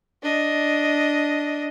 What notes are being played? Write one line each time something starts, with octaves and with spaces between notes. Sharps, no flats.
D4 D#5